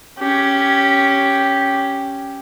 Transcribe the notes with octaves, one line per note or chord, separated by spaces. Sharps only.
C#4 G4